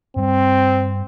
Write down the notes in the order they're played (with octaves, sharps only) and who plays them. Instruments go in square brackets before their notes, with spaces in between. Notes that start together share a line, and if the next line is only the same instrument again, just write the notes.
[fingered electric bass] G2 G3 [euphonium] C4